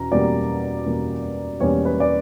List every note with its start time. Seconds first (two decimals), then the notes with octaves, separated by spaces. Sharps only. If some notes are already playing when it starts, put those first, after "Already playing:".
Already playing: E2 B2 C#4 A#5
0.12 E2 B2 G3 A#3 C#4 D5
0.86 E2 B2 G3 A#3 C#4
1.60 E2 B2 G3 A#3 C#4 C#5
1.85 B4
2.00 D5